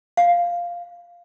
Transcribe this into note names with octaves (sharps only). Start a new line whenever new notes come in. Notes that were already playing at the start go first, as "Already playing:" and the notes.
F5